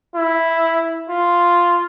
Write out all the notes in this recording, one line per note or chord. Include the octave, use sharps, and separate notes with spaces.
E4
F4